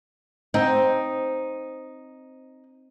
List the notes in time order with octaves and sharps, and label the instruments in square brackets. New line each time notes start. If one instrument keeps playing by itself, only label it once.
[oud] C4 [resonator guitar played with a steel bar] D#4